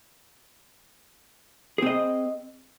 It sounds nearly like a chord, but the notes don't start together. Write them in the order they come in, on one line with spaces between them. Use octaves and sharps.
G#4 C4 D#5